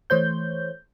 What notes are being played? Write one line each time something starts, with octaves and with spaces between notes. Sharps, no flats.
E3 A3 C5 C#5 G6